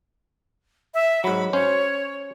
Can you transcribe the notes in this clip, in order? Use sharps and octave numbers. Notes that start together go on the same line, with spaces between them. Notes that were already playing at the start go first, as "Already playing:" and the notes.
E5
G#2 F#3 B5
C#4 C5 C#5